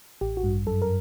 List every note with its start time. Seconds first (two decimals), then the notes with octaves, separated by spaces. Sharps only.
0.21 A1 G4
0.37 F#4
0.44 G2
0.67 F#2 A4
0.82 A#4